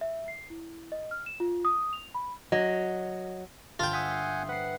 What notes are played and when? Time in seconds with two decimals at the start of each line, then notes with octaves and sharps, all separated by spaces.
0.01 E5
0.28 C7
0.50 E4
0.92 D#5
1.11 F6
1.26 E7
1.40 F4
1.65 D#6
1.93 F7
2.15 B5
2.52 F#3 D#5
3.80 G1 F4 G5 A5
3.93 E5 F#5 G#5 D#6 G6
4.11 C7
4.49 B4 F#5 C7